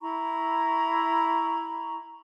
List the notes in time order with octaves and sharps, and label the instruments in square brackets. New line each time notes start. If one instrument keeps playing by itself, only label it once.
[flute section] E4 A#5 B5 C#6